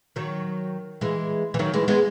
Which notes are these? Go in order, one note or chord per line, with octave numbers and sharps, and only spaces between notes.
D#3 F#3
E3 G#3
E3
D#3 F#3
E3 G#3
G#3 B3